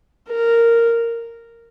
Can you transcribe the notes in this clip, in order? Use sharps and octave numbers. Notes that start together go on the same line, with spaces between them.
A#4